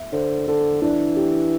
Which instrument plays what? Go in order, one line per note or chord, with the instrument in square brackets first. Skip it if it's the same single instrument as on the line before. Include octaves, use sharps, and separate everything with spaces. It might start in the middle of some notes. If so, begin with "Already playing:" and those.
Already playing: [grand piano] E5
[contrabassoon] D3 [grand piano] C5
[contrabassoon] D3 [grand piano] A4
[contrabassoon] E3 [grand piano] D4
[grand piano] G4